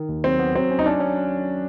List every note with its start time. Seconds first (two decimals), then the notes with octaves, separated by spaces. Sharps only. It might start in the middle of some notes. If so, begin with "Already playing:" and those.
Already playing: D#3
0.09 D#2
0.24 F#3 C4
0.39 B3
0.56 F#3 C4
0.71 C#4
0.79 D#4
0.86 C#4 D4
1.00 C#4